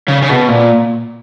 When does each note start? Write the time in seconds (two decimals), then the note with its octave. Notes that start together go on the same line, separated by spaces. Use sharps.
0.08 C#3
0.23 C#3
0.30 B2
0.49 A#2